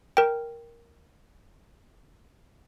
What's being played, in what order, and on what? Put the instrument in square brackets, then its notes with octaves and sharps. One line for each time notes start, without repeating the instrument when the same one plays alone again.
[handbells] A#4 G5